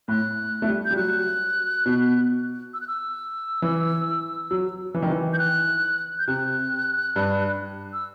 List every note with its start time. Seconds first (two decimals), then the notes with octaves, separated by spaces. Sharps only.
0.08 A2 F#6
0.62 A3
0.68 G3
0.85 G6
0.91 G3
0.96 F#3 F#6
1.86 B2
2.74 E6
2.81 F#6
2.88 E6
3.62 E3
4.51 F#3
4.94 E3
5.02 D#3
5.10 E3
5.33 G6
5.39 F#6
6.19 G6
6.27 C3 F#6
7.16 G2
7.93 E6